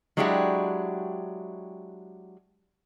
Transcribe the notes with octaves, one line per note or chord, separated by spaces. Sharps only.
F#3 G#3 D4 E4 F#4 G4